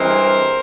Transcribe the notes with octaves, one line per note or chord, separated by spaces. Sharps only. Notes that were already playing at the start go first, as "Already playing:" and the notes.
Already playing: G2 E3 G#3 C4 A#4 C5